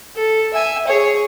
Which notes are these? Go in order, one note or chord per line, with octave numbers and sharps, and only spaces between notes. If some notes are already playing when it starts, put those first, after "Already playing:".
A4
E5 G#5
G#4 C#5